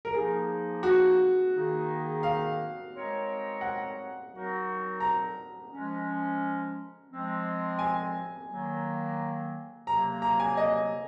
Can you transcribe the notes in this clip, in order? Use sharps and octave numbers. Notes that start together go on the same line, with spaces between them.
A#4
F3 A#3 D#4 G#4
F#4
D#3 A#3 D#4 G#4
F5
G#3 C4 D#4 A#4 C#5
F#5
F#3 C4 D#4 F#4 A#4
A#5
F3 G#3 C#4
F3 G#3 C4
G#5
D#3 F#3 A#3
C3 F#3 A#3 A#5
A#5
G#5
D#5